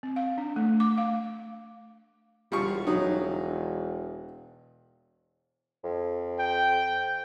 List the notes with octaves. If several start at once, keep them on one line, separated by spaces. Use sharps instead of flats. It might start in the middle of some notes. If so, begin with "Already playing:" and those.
C4
F5
D4
A3
D6
F5
E1 G3 F4 C#6
F#3 D#4
F2
G5